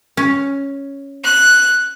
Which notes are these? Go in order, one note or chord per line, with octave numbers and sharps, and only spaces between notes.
C#4
F#6